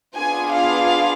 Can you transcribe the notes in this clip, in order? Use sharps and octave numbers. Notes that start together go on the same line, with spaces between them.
B3 D4 F4 G#4 G#5
F5